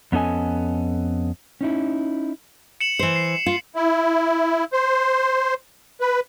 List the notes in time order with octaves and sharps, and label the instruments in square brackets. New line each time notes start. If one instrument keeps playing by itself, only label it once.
[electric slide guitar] F2 B3 C#4 A4 D#5 G#5
C#4 D#4 E4
[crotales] C#7 E7 F#7
[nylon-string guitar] E3 C5
[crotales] C7
[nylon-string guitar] F4
[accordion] E4
C5
B4